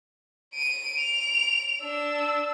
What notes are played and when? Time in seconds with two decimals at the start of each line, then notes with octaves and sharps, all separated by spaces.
0.54 D7 D#7
1.00 D7 F7
1.82 D4 E6